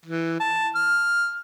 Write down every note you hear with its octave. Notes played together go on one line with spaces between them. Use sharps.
E3
A5
F6